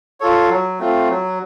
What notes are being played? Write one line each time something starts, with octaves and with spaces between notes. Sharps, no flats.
F4 A4 C#5
F#3
A3 C4 F4
F#3